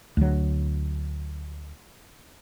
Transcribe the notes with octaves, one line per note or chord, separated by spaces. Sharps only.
D2 F#3